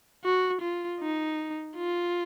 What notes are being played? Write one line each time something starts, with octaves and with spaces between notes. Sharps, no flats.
F#4
F4
D#4
F4